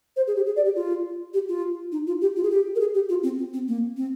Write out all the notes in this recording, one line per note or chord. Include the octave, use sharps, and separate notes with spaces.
C5
G#4
G4
G#4
D5
G4
F4
G4
F4
D#4
F4
G4
F4
G#4
G4
A#4
G#4
G4
F4
C4
C4
C4
A#3
C4